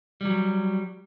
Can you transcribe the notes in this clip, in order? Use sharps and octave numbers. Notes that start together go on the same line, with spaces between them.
F#3 G3